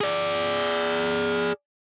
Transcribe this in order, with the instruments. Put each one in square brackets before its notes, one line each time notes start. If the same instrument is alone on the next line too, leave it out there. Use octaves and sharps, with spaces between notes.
[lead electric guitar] G#4 D5